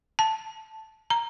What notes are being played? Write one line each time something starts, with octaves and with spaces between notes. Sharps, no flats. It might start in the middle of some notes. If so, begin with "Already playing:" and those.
A5
A#5